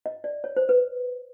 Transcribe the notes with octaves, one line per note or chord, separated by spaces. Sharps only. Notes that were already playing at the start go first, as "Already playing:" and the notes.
D#5
D5
C#5
C5
B4